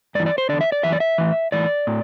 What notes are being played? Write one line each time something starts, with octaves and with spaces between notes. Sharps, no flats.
G2 E3 D5
D5
C5
E2 D3 D5
E5
D5
F#2 E3 E5
D5
E5
A2 E3
A2 E3 D5
A2